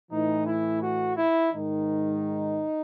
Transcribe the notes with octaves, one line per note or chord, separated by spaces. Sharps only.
A2 E3 D#4
E4
F#4
E4
G#2 D#3 D#4